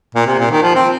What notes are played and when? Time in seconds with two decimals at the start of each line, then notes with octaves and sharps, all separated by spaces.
0.15 A#2
0.27 C3
0.39 A#2
0.51 D#3
0.62 F3
0.75 C4